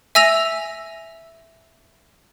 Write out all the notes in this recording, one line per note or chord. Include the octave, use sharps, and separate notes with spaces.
E5 G#5 E6 A#6 F7